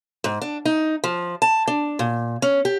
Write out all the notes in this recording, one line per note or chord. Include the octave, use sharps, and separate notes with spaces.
G#2
D4
D#4
F3
A5
D4
A#2
C#4
G4